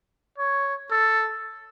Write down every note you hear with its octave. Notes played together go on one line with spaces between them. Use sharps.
C#5
A4